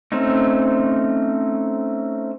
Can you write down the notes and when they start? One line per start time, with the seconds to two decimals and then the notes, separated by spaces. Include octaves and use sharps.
0.12 A3 C4 C#4 D#4